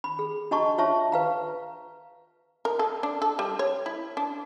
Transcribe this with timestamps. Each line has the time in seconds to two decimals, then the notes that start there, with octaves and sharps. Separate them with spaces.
0.04 B5
0.19 G#4
0.51 D4 F#4 D#5 A5 A#5 C#6
0.78 F4 C#5 E5 A5 C#6
1.12 B4 F5 A#5
2.65 A#4
2.79 A4
3.03 D4
3.22 A4
3.39 G3
3.59 C#5
3.86 E4
4.17 D4